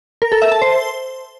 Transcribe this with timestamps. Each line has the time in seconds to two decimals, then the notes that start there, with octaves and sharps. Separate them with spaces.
0.22 A#4
0.32 A4
0.42 E5
0.52 A5
0.62 C5